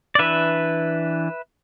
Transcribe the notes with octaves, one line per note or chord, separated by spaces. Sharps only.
D5
E3 D4 B4 E5